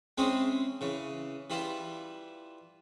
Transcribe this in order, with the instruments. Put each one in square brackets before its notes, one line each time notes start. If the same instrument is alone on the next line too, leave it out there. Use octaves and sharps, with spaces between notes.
[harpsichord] G#3 C4 C#4 E4 G#4
C#3 E3
E3 G3 E4 F4